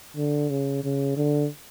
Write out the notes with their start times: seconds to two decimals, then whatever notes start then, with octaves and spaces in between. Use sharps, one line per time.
0.17 D3
0.50 C#3
0.84 C#3
1.17 D3